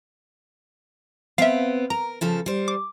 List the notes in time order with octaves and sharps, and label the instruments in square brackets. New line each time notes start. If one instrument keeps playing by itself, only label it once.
[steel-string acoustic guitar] B3 C4 [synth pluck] E5 F5
[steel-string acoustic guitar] A#4 [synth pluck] A#5
[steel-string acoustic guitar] C#3 F3 A4
G3 C5
[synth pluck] D6